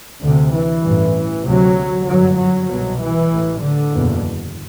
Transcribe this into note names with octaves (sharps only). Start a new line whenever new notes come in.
D2 D3
C3
E3
A1 G2
D2 C3 F#3
G1 F#2 F#3
F#3
C2 B2 F#3
E3
A1 A2
D3
F#1 E2 B2